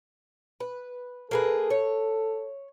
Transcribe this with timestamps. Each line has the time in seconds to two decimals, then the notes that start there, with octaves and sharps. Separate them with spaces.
0.60 B4
1.31 A#3 G#4 A4 B4
1.70 C#5